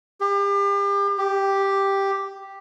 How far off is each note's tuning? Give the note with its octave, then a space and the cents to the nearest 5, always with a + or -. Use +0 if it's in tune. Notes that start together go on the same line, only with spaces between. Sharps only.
G4 +35
G4 +0